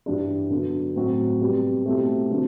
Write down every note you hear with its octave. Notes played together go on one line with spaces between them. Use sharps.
G2 E3 G3 D4
D3 F#3 B3
A2 F#3 C4 F#4
C3 G3 B3
B2 A3 C4 E4 G4
D3 F#3 C4